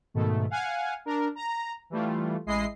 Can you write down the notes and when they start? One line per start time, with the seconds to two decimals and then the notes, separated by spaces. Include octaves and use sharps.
0.14 G#2 B2 D#3 A3
0.50 F5 F#5 G#5
1.06 D4 A#4
1.35 A#5
1.90 E3 G3 A3 F4
2.46 A1 G#3 E4 D#5 C7